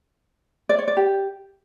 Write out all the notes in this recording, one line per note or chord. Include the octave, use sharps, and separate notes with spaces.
D5
C#5
D5
G4